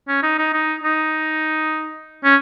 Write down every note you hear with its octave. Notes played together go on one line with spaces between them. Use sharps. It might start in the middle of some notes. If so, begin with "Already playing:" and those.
C#4
D#4
D#4
D#4
D#4
C#4